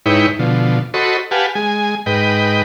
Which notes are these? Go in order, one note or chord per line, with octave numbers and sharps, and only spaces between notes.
G#2 D#4 E4 B4 C#5 G5
B2 D3 F3
F#4 A4 C5 D#5 B5 C#6
G4 B4 F5 F#5 G#5 A5
G#3 G#5
G#2 B4 D#5 G5